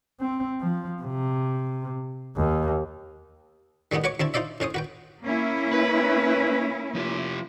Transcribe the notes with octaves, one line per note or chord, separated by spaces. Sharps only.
C4
F3
C3
D#2
D#3 G3 G#3 B3 D#4
F#4 B4 C#5 C#6 D6
D2 C4 E4 A5
D#4 F4 C5 D5 E5
A2 C#4 C5 D#6
F#4 B4 G5
A#3 C#4 E4
B4
F3 F4 G4